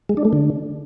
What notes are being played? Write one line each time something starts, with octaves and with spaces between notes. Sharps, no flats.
G#3
D4
A3
D3